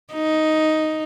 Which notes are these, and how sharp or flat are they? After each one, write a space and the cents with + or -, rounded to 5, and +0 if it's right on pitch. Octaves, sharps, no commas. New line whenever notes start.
D#4 +5